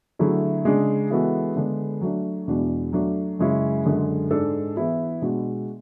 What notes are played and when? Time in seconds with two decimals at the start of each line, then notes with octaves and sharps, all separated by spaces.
0.19 D3 F#3 A3 E4 G#4
0.65 C#3 G#3 D4 G#4
1.10 E3 G#3 B3 F#4 A4
1.56 D3 G#3 B3 D4
2.01 F#3 A3 D4
2.48 E2 B2 G#3 D4 F#4
2.93 F#3 A3 D4
3.39 F#2 C#3 G#3 C#4 E4
3.85 F#2 D3 G#3
4.31 G#2 G#3 D4 A4
4.76 E3 B3 E4 G#4
5.22 B2 G#3 D4 F#4